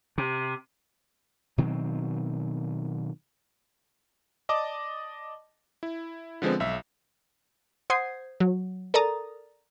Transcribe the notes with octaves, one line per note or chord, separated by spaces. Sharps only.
C3
B2 D#3 F#3 C4
D5 D#5 A5 D6
E4
D3 F3 G#3 B3 C4
B1 E5
C5 F#5 D#6 G6 G#6 C7
F#3
A4 A#4 D5 A#5 D#6 A6